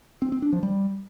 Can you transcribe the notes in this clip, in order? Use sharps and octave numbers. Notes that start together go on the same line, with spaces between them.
C4
C4
D4
F3
G3